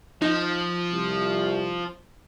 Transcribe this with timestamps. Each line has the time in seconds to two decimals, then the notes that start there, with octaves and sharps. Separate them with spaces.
0.22 F3 D#4
0.93 C2